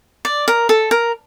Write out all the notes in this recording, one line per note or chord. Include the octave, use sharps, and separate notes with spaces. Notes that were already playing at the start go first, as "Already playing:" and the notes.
D5
A#4
A4
A#4